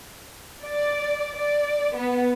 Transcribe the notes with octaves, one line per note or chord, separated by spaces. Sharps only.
D5
D5
B3